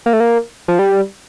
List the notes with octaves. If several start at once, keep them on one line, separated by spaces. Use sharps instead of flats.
A#3
A3
A#3
F3
G3